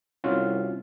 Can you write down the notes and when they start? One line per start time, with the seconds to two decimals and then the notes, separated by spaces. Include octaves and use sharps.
0.24 C2 C#4 F4 F#4